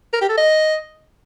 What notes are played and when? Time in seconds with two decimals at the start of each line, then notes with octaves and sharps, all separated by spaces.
0.13 A#4
0.21 G4
0.29 A4
0.37 D#5